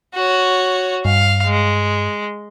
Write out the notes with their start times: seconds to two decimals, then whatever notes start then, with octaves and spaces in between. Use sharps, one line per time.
0.15 F#4 C#5
1.05 G2 F5
1.46 G#3